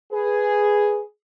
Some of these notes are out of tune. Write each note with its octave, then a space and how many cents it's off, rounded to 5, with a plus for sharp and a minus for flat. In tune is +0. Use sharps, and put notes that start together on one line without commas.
G#4 +0 B4 +0